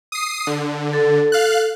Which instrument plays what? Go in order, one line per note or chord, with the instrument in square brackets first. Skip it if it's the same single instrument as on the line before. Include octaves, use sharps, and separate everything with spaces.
[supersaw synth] D#6 C7
D3
[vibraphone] A4
[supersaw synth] F5 F#6